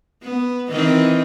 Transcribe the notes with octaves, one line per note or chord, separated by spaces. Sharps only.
B3
D#3 E3 C4